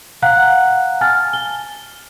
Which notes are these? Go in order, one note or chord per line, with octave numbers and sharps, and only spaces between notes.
F5 F#5 A#5 F#6
G#5 A5 F6 A6
G7